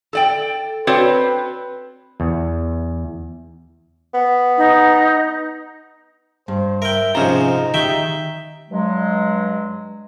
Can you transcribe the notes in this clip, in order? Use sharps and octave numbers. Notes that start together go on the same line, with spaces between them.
A4 D5 G5
C4 F#4 B4 C#5 D5
E2
B3
D#4
G2 C5
A#4 E5 G5
G#2 C3 F3 C#4 D#4 A#5
D#3 G4 E5 G5
G2 F#3 G#3